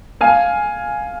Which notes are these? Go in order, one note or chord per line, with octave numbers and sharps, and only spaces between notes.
F5 G#5